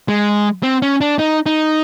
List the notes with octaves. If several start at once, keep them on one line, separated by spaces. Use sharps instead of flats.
G#3
C4
C#4
D4
D#4
D#4